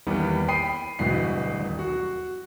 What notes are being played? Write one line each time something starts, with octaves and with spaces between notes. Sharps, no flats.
E2 D#3 E3 G3 A#3 B3
G5 B5 D#6 C7 D#7
D1 G2 B2 E3 C7
D#1
F#4